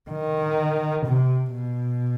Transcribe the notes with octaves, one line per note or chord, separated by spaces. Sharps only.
D#3
C3
B2